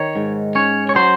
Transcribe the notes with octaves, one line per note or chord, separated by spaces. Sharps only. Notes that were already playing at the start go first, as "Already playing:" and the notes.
Already playing: D#3 C#5
G#2
C#4 C#5
C#5
F#3 C5